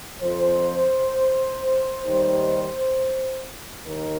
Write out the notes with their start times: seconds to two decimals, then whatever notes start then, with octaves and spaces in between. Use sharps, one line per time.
0.21 F2 F3 C5
2.04 D#2 D#3 G3
3.86 D#2 D#3 A#4